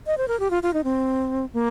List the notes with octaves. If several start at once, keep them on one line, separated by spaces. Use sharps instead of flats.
D#5
C5
A#4
G4
F4
F4
D#4
C4
A#3